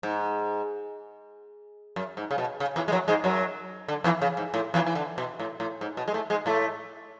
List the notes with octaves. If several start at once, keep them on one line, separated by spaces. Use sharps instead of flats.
G#2
F#2
G#2
C#3
B2
C#3
E2 E3
G#3
F#2 F#3
G#2 G#3
F#2 F#3
D3
E2 E3
C#3
G#2
A2
E2 E3
E3
D3
B2
A2
A2
G#2
B2
G#3
A2 A3
G#2 G#3
A2 A3